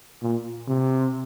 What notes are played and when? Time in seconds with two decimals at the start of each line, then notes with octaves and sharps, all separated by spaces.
0.22 A#2
0.68 C3